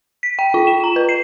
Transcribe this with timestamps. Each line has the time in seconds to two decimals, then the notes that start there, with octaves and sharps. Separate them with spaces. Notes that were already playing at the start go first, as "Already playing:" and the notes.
0.23 B6
0.39 G5
0.54 F4
0.67 E7
0.84 A#5
0.96 B4
1.09 C7